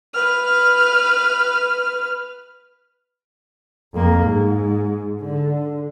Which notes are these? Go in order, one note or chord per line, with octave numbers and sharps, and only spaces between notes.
B4 F6
F2 A#3
G#2
D3